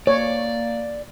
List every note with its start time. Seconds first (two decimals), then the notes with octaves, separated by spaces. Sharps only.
0.07 A#3 C#5 D5